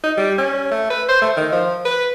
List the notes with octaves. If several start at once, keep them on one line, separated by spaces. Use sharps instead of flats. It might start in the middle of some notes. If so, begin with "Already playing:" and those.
D#4
G3
C#4
A3
B4
C5
A3
D#3
F3
B4